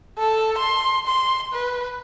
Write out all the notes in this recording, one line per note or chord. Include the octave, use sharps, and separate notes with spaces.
A4
C6
C6
B4